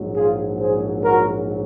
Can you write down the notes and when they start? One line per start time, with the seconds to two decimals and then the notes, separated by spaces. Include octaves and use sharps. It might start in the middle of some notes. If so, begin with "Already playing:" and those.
Already playing: A#1 G#2 F#3
0.15 F4 G#4
0.60 G#4 C5
1.04 F#4 A#4